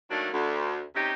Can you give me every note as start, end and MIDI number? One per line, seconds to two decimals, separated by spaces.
0.10 0.28 51
0.10 0.28 54
0.10 0.28 57
0.10 0.28 58
0.10 0.28 62
0.33 0.82 38
0.95 1.13 48
0.95 1.13 61
0.95 1.13 63
0.95 1.13 67